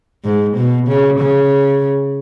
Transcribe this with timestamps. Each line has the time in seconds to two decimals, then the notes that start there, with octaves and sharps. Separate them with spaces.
0.25 G#2
0.57 B2
0.88 C#3
1.19 C#3